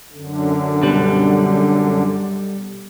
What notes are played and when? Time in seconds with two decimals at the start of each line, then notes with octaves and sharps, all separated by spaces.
0.13 F#2 D3
0.82 B2 G3 B4